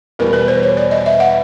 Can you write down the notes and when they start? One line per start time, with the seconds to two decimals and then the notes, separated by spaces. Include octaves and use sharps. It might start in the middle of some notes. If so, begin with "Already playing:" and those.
0.19 E2 B2 G3 A#4
0.33 B4
0.48 C5
0.63 C#5
0.77 D5
0.91 D#5
1.06 E5
1.20 F#5